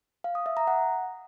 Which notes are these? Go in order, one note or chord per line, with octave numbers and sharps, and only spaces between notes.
F5
D#6
E5
A#5
F#5